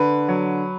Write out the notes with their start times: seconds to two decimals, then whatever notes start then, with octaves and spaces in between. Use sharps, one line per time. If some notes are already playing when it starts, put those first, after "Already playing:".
Already playing: D3 B4
0.28 F#3